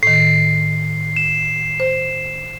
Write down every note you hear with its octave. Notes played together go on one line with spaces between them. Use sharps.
A2 D#3 C7
E7
C5